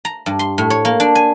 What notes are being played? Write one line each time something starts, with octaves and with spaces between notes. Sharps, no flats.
A#5
G2
C6
A2
C#5
A#3
D4
G#5